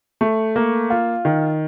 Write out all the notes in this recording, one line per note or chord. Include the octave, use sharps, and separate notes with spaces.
A3
A#3
F4
D#3